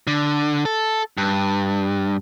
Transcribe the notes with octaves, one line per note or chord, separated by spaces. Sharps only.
D3
A4
G2